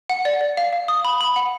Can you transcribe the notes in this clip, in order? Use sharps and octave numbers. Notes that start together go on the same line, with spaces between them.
F#5
D5
D5
F5
F5
D#6
B5
B5
F#5